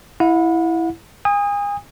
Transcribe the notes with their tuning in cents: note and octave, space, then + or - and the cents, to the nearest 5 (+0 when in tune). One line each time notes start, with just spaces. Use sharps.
E4 +0 F#5 -40
G#5 -35 D#6 +0